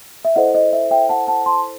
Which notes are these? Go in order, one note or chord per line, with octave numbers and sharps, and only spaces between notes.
E5
E4 A4 C5 D#5 F#5
D#5
E5
E5 G5
F#5 A5
F#5 A5
A5 C6